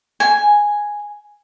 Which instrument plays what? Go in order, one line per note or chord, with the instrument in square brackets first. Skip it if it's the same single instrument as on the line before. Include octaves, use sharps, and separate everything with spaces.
[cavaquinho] G#5